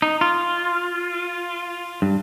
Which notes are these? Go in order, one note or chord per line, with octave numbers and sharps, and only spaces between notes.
D#4
F4
G2